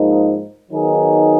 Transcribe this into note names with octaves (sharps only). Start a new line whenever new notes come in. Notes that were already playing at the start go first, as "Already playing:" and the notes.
Already playing: G#2 F3 A#3 D#4
D#3 F#3 B3 D#4 G#4